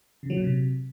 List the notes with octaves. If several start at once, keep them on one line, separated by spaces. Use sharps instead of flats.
C#3
F#3
A#2
C3